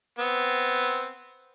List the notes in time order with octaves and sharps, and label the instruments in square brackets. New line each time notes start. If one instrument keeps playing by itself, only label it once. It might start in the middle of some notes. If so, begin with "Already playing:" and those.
[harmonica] B3 C4